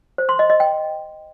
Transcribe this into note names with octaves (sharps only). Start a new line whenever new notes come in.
C5
C6
D#5
D#5
G5